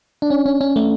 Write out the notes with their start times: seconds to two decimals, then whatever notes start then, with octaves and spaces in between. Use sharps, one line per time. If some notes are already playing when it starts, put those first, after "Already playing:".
0.22 D4
0.30 C#4
0.46 C#4
0.61 C#4
0.76 A3